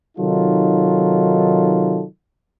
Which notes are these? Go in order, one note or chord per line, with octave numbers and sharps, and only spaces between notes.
C3 D#3 F#3 D#4 F4 A4